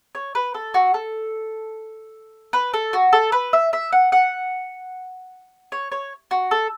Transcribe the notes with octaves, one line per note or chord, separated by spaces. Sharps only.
C#5
B4
A4
F#4
A4
B4
A4
F#4
A4
B4
E5
E5
F#5
F#5
C#5
C#5
F#4
A4